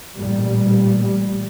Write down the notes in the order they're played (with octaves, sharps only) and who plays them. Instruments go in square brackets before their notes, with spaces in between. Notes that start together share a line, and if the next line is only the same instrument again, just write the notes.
[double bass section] A1 A#2 G3